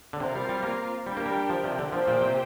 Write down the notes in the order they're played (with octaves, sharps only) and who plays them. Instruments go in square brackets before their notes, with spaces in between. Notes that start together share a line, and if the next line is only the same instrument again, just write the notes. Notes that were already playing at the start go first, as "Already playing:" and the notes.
[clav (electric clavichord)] D3
[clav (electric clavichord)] C3 [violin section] C4 F4 A#4 F5
[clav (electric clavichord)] G3
G3
A#3
[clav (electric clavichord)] G3 [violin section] D4 G4 A#4 G5
[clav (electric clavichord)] A#3
G3
F3
C3
D3
[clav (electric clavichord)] F3 [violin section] A#3 G4 C5 G5
[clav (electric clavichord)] A#2
C3